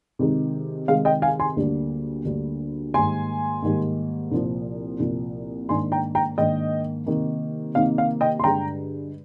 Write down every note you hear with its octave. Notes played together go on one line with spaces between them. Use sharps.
C3 D#3 G#3 D#4
C3 D#3 G#3 D#4 F5
D#5 G5
F5 G#5
G#5 C6
D2 D3 G3 A#3 D4
D2 D3 G3 A#3 D4
G#2 D#3 G3 A#3 G#5 C6
G#2 D#3 G3 A#3
C2 A#2 F3
C2 A#2 F3
G#2 D#3 A#3 D4 G#5 C6
G5 A#5
G5 A#5
G#2 D#3 A#3 D4 D#5 G5
C3 D#3 A#3 D#4
C3 D#3 A#3 D#4 F5
F5
D#5 G5
C6
G2 D3 G#3 G5 A#5